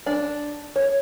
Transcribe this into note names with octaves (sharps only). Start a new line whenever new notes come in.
D4
C#5